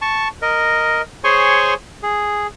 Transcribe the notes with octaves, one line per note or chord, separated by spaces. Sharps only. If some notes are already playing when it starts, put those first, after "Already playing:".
A5 C#6
A#4 D#5
G#4 C5 C#5 G#5 C6 C#6
G#4